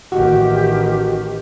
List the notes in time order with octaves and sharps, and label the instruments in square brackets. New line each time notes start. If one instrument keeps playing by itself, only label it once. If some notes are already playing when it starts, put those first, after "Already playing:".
[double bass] A1 D#3 [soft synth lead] F#4 [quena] G4